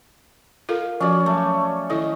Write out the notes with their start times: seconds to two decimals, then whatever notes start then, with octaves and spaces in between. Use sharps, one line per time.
0.69 F4 A4 A#4 F5
1.00 F3 C#4 F#4 D5
1.26 F#3 A3
1.90 D#3 E4 A4 D#5